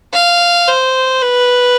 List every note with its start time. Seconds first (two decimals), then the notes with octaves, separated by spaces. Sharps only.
0.13 F5
0.67 C5
1.22 B4